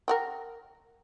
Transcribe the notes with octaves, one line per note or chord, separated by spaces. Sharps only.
A#4 F#5 G5